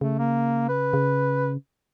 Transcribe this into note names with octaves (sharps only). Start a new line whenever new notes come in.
C#3 A3
A#3
B4
C#3